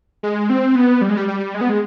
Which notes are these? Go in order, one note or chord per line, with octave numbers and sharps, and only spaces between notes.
G#3
C4
B3
G3
G#3
G3
G3
G#3
B3
G#3